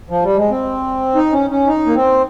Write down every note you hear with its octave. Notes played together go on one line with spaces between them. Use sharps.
F3
G3
G#3
C4
D#4
C#4
C#4
D#4
A#3
C4